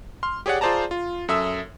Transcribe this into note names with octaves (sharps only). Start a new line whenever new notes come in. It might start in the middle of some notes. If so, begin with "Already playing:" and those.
C6 F6
G4 G#4 C#5 D5 F#5
F4 G#4 C5 D5 A5 A#5
F4
F#2 A4 E5 D#6 E6